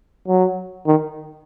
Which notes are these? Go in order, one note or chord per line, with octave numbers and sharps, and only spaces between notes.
F#3
D#3